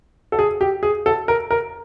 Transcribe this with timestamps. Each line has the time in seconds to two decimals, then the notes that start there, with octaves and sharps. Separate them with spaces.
0.32 A4
0.39 G#4
0.61 G4
0.83 G#4
1.06 A4
1.28 A#4
1.51 A#4